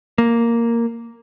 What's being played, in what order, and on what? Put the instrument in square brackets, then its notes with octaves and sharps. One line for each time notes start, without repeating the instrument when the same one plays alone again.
[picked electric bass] A#3